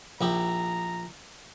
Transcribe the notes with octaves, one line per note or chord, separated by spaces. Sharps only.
A#1 E4 G4 A#5